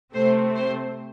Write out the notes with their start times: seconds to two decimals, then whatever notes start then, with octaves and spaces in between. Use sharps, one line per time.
0.14 C3 A3 C4 C5
0.56 C5